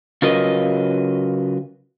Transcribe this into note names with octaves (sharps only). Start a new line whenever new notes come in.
C#3 F#3 F4 A#4 B4 D#5